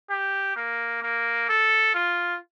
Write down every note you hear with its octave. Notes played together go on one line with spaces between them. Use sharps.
G4
A#3
A#3
A4
F4